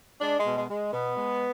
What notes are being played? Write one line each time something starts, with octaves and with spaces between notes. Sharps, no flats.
G#3 D4
G#3
B2
G#3
G#3
B2 B3
G#3